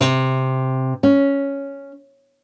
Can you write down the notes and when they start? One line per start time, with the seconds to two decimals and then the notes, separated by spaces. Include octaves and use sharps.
0.01 C3
1.03 C#4